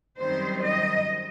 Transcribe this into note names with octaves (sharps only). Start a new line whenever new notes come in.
F#2 D#3 G3 C4 C5
D#5